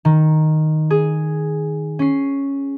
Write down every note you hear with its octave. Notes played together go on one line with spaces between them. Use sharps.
D#3
G#4
C#4 C7